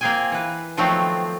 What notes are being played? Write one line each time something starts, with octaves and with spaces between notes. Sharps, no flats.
A#3 C4 F4 G#4 G5 G#5
E3 B4
D#3 F3 F#3 A3 B3 C4